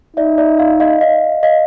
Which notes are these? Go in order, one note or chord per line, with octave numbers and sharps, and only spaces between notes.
D#4 D5 E5
D5 E5
D#5 F5
D#5 F5
D#5 F5
D#5 F5